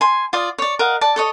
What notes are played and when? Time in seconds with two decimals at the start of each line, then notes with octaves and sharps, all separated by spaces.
0.01 G#5 C6
0.33 F4 D5 D#6
0.58 C#5 D5
0.79 A#4 D#5 F5 F#5
1.01 D5 A5
1.16 A4 C#5 D#5